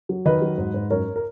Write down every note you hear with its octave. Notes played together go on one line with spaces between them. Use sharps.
F#3
D#3 B4 D#5
F#3
G#2
G#2
F#2 A#4 C#5
A#4